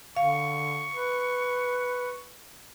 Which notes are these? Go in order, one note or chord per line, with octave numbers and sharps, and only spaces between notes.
D3 F5 C#6
B4